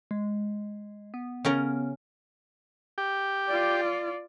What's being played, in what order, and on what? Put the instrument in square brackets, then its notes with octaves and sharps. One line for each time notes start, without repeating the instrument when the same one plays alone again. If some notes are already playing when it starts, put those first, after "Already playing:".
[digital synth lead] G#3
B3
[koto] C#3 C#4 A#4
[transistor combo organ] G4
[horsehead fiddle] F4 D5